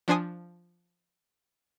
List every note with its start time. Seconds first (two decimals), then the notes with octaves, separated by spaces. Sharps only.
0.08 F3 D4 C5 G#5 D#6